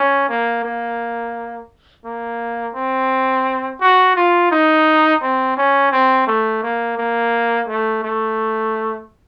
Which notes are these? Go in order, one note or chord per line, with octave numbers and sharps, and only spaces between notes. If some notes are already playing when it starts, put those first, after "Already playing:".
Already playing: C#4
A#3
A#3
A#3
C4
F#4
F4
D#4
C4
C#4
C4
A3
A#3
A#3
A3
A3